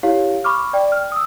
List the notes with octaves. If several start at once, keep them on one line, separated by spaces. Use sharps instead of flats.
E4 G4 C#5 F5
B5 C#6 D6 F6
D5 G5
F6
D#6 E6